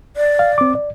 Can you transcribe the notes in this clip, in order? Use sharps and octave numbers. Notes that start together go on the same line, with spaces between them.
D5
F5
C4 D6
D5